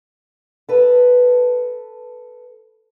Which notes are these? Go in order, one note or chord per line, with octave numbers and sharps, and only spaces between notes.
A4 B4